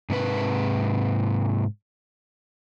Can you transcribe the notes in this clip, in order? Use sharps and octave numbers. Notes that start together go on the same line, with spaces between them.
G#2 C3 B4